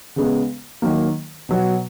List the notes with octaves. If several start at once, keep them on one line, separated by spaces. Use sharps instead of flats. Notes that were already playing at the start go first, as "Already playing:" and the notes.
C#3 G#3 B3
D#3 F#3 A#3
B2 F#3 B3 F#4